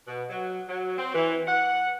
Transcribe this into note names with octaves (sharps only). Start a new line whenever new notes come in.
B2
F#3
F#3
C4
E3
F#5